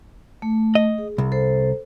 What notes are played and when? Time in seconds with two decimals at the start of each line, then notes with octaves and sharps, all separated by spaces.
0.42 A3
0.75 D#5
0.98 G#4
1.18 C2
1.32 A4 C5